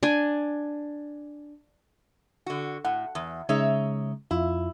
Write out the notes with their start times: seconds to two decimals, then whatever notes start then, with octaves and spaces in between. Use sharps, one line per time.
0.03 D4 G#5
2.46 D3 F#4
2.85 A2 F#5
3.15 E2
3.49 C#3 G#3 D#4 C#5 E5
4.31 F2 E4 F4